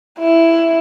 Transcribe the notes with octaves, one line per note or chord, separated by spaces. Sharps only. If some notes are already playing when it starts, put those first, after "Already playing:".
E4